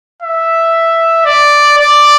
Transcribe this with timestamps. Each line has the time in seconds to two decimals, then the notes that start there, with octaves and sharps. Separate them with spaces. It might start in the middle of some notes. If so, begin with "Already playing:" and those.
0.22 E5
1.25 D5
1.78 D5